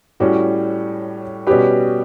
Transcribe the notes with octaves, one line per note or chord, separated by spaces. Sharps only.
A2 G3 C#4 F#4
B2 G3 C#4 G4 B4